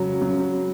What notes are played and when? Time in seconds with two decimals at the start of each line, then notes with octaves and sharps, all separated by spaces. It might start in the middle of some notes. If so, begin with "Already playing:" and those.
Already playing: C#3 F#3
0.21 F#3